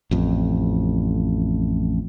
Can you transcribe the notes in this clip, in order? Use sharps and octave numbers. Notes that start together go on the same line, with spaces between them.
A1 F2